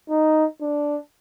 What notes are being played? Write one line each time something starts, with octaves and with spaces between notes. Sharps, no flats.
D#4
D4